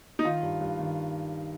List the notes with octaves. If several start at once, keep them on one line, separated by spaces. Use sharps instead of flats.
D#4
D#3 F4
G2
G2
D#3